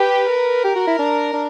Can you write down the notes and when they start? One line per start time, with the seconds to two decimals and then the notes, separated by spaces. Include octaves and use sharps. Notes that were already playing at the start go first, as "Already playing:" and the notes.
Already playing: G4 B4
0.29 A#4
0.64 G4
0.76 F#4
0.87 E4
0.99 D4
1.34 D4